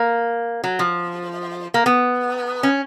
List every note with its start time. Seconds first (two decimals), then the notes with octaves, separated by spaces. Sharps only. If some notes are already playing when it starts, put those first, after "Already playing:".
Already playing: A#3
0.64 F#3
0.79 F3
1.74 A#3
1.86 B3
2.63 C#4